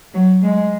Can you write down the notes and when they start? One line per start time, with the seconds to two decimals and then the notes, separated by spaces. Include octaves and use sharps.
0.14 F#3
0.42 G#3